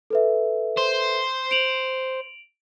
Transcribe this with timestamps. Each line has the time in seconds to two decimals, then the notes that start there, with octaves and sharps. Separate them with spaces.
0.10 A4 B4 E5
0.77 C5
1.51 D7 F7 F#7